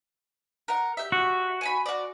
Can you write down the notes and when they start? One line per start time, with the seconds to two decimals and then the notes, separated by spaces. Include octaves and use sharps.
0.68 A#4 F#5
0.97 G4 E5
1.12 F#4
1.61 G#5 A5 B5
1.86 F#4 D5